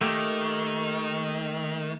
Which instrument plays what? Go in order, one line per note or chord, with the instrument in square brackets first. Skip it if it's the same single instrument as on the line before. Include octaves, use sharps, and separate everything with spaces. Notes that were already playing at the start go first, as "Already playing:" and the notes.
[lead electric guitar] D#3 [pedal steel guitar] A3 A#3 G4